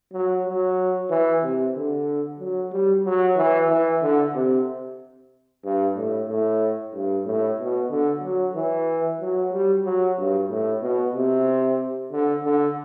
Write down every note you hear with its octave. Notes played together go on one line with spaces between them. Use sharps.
F#3
F#3
E3
C3
D3
F#3
G3
F#3
E3
E3
D3
C3
G2
A2
A2
G2
A2
B2
D3
F#3
E3
F#3
G3
F#3
G2
A2
B2
C3
D3
D3